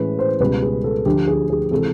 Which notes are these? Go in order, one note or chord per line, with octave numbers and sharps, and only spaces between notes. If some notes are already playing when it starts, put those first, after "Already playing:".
Already playing: A2 E3 G#3 C#4 B4
C5
C#2 B2 G3 B4
G#4
A4
D2 D3 F3 G4
G#4
G#4
C3 E3 G#3 C4 A4